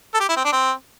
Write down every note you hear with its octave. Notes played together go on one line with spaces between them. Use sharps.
A4
G4
E4
C4
D4
C4